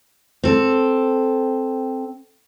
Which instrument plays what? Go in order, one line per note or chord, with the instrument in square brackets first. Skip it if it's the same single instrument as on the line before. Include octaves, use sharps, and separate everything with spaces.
[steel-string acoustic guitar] C4 A4